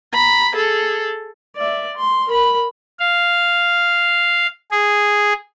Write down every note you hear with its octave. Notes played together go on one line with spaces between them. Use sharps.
A#5 B5
G#4 A4
D5 E5
C6
A#4 B5
F5
G#4